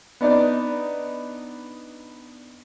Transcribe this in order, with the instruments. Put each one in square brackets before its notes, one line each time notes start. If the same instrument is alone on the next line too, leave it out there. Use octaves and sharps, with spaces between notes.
[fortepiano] B3 D4 D#4 D5